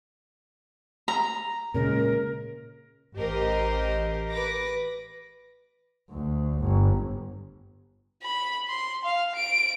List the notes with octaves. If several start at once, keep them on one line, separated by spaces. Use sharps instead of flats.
A#5
A#2 C#3 G#3 A#4
A1 G4 A#4 C5 D#5
B4 D6 A#6
D2
G1
B5
C6
F5
D7